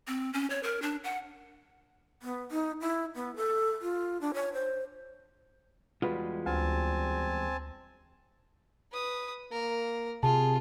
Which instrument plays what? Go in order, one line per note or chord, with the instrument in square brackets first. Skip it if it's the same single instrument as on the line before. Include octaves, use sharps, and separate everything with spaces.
[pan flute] C4
C#4
C#5
A#4
D4
F#5
[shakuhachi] B3
D#4
E4
B3
A4
F4
D4
C#5
C5
[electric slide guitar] E2 G3 G#3 [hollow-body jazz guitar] F4 F#4 B4
[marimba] D2 [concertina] C4 G#5 A5
[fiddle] B4 D#6
[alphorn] A#3 [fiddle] A#4
[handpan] C3 [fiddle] F4 [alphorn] G#4 [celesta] A5